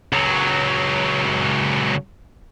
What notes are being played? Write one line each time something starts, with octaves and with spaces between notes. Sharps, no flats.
C#2 F#3